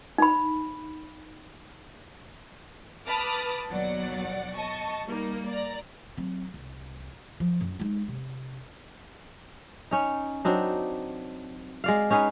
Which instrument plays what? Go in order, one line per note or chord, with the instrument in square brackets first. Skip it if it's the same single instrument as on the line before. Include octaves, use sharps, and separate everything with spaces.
[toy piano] D#4 B5
[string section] B4 A5 B5 D6 D#6 F6
D#2 B2 F#3 D5 F#5
D#5 A5 C#6
G3 A#3 D#4
D5 A#5
[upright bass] F#3 C4
C2
F3
F#2
G#3 D#4
C3
[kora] C#4 D#4
F#3 C4 D4 D#4
G#3 D5 F5
C#4 D#4 G#4 B4